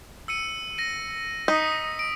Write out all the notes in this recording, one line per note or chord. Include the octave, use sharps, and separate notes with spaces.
E6 C#7 D#7
A#6 D#7
D#4 D#6 B6
D7